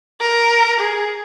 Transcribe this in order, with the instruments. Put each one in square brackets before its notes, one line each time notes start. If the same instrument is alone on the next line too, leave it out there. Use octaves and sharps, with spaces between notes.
[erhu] A#4
G#4